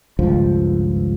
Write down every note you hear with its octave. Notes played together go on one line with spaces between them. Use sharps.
G#1 C#2 G2 F3